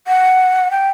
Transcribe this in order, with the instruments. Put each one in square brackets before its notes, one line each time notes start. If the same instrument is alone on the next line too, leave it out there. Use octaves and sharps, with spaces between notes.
[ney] F#5
G5